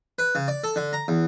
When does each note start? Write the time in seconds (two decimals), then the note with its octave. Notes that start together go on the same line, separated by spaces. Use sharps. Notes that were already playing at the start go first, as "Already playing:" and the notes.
0.19 B4
0.35 C#3
0.48 D5
0.64 A4
0.76 D3
0.93 A#5
1.08 E2